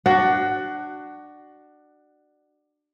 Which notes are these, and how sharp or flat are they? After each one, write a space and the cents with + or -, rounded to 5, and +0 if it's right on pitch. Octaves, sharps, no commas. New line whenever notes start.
D4 +20 F#4 +20